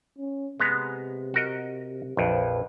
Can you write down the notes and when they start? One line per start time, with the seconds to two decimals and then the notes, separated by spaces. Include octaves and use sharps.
0.18 C#4
0.60 C3 G#3 B3 A#5
1.34 F#4 A#4 D#5
2.17 A#1 F2 B4